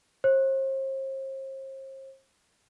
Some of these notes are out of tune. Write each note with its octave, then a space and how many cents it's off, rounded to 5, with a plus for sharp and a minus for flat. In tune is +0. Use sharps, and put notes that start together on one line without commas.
C5 +40